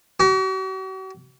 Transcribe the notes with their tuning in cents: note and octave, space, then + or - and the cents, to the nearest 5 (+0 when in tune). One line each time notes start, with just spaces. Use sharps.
F#4 +45